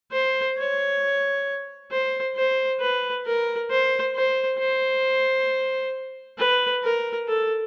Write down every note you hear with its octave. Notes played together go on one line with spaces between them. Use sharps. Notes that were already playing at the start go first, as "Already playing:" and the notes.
C5
C#5
C5
C5
B4
A#4
C5
C5
C5
B4
A#4
A4